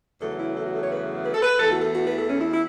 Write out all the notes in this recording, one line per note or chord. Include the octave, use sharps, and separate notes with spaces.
E2 C#3 F#3 A3 A4
E4
A4
F#4
A4
C#5
B4
B4
A4
B4
E2 E3 A3 A4
F#4
A4
F#4
B4
A4
C#4
E4
E4